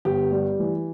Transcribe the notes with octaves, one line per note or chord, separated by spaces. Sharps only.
G1 G4
G3
E3